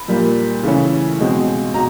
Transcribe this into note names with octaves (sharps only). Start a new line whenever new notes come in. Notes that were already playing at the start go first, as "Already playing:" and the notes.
Already playing: B5
A#2 G3 A#3
C#3 E3 A3 C#4
B2 G#3 C4
B2 A#5